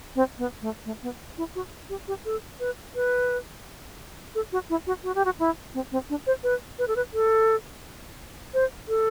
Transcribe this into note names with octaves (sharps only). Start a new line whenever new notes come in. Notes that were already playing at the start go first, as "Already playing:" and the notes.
C4
B3
A3
A3
B3
E4
F#4
G4
G4
A4
B4
B4
A4
F#4
E4
F#4
F#4
G4
F#4
E4
C4
C4
D4
C5
B4
B4
A4
B4
A4
C5
A4